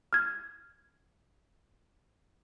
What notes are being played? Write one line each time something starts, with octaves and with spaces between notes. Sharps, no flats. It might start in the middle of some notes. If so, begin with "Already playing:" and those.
F6 G#6